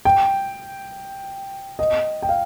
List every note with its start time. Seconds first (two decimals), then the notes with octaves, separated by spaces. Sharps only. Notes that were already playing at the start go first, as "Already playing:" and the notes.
0.05 G5
1.79 D#5
2.22 G5
2.29 F5